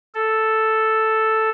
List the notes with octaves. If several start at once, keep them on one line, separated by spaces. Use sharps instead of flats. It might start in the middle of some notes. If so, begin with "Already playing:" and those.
A4